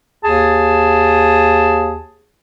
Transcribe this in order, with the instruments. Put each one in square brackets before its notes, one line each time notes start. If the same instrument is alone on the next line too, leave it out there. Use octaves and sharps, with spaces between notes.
[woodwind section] D#2 G#4 A5